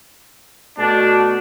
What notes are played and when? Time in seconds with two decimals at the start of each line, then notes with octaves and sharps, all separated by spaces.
0.78 B2 A3 D4 F#4